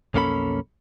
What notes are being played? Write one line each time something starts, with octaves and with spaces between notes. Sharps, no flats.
B1 F2 A#3 C#4 A4 B5